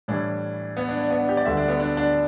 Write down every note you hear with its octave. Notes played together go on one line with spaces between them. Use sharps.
A2 E3 G3 D4
B3
D4
D4
B3
D4
G4
D5
D2 D3 G3 E5
D4
B3
D4
D4